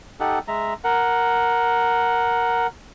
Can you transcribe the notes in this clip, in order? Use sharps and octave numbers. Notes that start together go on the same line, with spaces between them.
D#4 G4 A4 F#5
G#3 E5 A#5
A#4 F#5